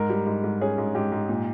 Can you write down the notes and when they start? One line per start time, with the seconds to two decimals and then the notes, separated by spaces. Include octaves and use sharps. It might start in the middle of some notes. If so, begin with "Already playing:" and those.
Already playing: G#2 A#4
0.09 G3
0.26 G#2
0.44 G#2
0.61 C#4 G#4
0.78 G#2
0.95 G#2 G4
1.12 G#2
1.29 A#2